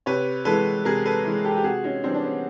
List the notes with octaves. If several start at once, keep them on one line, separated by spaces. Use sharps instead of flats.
C3 B4 C#5
E3 G#3 A4 B4
C3 G#4 A#4
A4 B4
E3 G#3
G4 A4
G4
C3 F#4 G#4
C#4 D#4
E3 G3 C4 D4
D4
B3 C#4